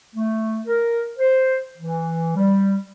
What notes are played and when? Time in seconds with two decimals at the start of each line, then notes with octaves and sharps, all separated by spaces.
0.15 A3
0.67 A#4
1.18 C5
1.78 E3
2.36 G3